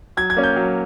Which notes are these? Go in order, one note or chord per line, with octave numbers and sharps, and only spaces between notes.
F#3 G#6
G#6
A#3 C#4
G6
F#3